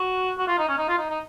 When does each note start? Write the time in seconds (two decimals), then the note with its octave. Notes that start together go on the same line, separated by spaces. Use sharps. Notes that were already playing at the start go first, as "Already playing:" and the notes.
Already playing: F#4
0.38 F#4
0.48 F4
0.59 D#4
0.68 C#4
0.78 D#4
0.89 F4
0.98 D#4
1.10 D#4